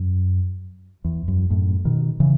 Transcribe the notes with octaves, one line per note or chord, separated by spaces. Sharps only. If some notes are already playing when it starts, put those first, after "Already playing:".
Already playing: F#2
E2
F#2
F#2 A2
B2 D#3
C#3 E3